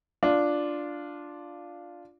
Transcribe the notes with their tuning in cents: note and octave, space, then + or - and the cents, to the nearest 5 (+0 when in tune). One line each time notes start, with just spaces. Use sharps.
D4 +0 F4 +0